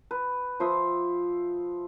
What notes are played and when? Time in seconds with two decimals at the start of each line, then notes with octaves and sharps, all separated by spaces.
0.11 B4
0.60 F3 C5 E5 D#6